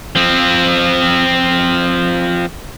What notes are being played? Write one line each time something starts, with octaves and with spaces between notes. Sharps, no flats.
F3 C4